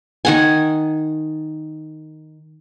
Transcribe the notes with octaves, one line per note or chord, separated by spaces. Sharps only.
D#3 F#5 G#5